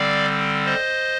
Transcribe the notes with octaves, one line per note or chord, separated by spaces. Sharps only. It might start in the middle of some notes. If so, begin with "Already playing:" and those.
Already playing: D3 G3 C4 D5 F5
C5 D#5